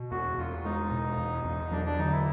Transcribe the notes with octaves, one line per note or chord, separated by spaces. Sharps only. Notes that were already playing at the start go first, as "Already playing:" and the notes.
Already playing: B2
E2 F#4
E2 F4
G#3 D#4
B2
E2
E2
F#3 D4
D4
D3 D#4
E4